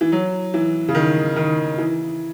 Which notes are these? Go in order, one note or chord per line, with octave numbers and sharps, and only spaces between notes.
E3
F#3
E3
C#3
D#3
D#3
E3